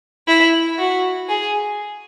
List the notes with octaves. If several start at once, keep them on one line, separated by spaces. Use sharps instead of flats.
E4
F#4
G#4